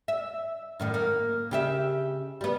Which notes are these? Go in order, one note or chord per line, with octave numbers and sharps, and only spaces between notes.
E5
F#2 A2 D#3
A#3
C#3 G4 E5
G3 B3